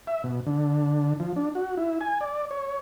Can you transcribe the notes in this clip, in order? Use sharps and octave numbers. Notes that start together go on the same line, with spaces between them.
E5
B2
D3
F3
D4
F#4
E4
G#5
D5
C#5